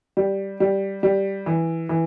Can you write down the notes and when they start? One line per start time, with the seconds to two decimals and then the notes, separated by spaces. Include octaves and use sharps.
0.17 G3
0.60 G3
1.03 G3
1.46 E3
1.89 E3